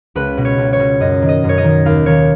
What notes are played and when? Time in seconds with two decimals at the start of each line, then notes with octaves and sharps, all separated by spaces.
0.15 C#2 B4
0.37 B2
0.45 C#5
0.58 C#2
0.73 C#5
0.79 B2
1.00 F#2 D#5
1.22 D#3
1.29 D#5
1.44 F#2
1.49 C#5
1.58 D#5
1.64 D#3
1.86 D#2 F5
2.06 D#3 C#5